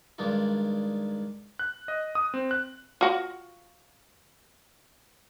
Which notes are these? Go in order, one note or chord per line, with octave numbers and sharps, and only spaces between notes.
G2 D#3 G#3 D4 D#4 F4
F#6
D#5
D#6
C4
F#6
F4 F#4